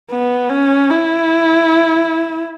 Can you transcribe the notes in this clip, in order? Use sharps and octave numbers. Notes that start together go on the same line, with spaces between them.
B3
C#4
E4